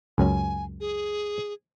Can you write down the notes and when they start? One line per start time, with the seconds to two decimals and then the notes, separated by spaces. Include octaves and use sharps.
0.18 C#2 F#2 C#4 G#5
0.80 G#4